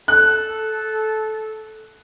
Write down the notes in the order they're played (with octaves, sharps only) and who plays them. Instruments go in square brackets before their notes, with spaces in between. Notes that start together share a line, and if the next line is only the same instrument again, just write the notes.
[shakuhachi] A4 [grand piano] F#6